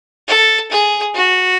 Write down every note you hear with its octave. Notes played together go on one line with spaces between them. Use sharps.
A4
G#4
F#4